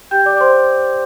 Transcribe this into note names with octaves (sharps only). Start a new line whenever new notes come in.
G4 G5 G6
D5 D6
D6
C5 C6